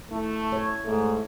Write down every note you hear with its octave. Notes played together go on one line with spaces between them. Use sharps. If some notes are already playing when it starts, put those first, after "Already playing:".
A3 E4
C#5
G#2 A3